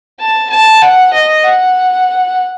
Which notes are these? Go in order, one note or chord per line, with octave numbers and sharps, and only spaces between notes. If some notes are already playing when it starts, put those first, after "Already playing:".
A5
A5
F#5
D#5
F#5